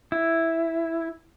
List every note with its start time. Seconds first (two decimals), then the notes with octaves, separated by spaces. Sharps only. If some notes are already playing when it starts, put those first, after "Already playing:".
0.12 E4